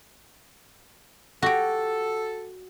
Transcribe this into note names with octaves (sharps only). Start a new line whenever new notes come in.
F#4 G4 A4